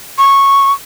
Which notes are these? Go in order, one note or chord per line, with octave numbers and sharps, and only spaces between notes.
C#6